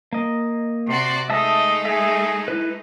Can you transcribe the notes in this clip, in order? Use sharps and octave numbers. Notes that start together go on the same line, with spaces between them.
A#3 D#5
C3 F#4 D5 C6
G#3 A3 D#4 D#5 E5 A5 D#6
G#4 E5
E4 B4